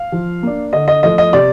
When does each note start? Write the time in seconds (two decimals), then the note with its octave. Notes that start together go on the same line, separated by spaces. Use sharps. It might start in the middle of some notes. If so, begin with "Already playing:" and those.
Already playing: F5
0.12 F3
0.43 A#3 D4
0.73 D3 D#5
0.88 D#5
1.03 F3 A3 D#5
1.18 D#5
1.33 C3 D5